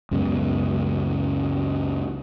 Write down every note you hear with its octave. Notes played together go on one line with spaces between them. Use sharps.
C#2 F#2 C#3 B3